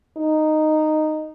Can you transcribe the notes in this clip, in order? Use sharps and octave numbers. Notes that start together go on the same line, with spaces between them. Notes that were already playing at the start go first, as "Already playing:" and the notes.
D#4